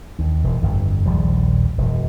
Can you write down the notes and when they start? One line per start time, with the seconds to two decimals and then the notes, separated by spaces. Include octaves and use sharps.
0.19 D#2
0.44 E1
0.62 G1 F2
1.06 D#1 A#1 F3 G3
1.78 E1 F#2